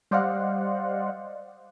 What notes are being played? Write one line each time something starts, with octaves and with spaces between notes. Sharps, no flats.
G3 C5 D5 D#5 F5 F#5